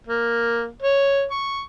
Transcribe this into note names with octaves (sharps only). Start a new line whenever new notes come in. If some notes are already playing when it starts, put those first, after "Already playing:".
A#3
C#5
C#6